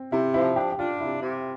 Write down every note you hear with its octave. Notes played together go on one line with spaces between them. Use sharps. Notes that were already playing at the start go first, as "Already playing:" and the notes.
Already playing: C4
C3 E4
F3 E4
D4 G4
G4
D4 F4
C3 E4
C3